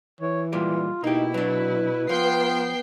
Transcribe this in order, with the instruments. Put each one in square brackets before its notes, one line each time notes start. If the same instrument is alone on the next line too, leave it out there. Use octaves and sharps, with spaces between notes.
[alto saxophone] E3 [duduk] C#5
[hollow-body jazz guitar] A#2 G3 G#3 [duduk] F4
[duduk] B2 [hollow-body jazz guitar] A#3 G4 [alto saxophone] D#4 [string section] E4
[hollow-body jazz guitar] F#3 D4 [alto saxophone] B4
[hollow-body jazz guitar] F3 [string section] B3 G5 C7 [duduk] F4